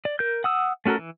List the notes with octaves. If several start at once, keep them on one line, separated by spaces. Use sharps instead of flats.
D5
A#4 G6
F#5 D#6 E6
A3 C#4 F#4 A4 A#4
E3